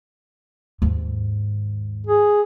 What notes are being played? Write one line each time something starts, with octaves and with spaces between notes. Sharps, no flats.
D#2 G#2
G#4